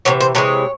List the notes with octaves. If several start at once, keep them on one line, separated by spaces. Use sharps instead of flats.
C3 E3 C#5
C5
C3 E3 G#3 C#5